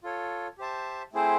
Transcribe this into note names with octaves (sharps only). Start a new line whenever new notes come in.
F4 A4 C#5
G4 C5 E5 A5
A3 C4 E4 G#4 C5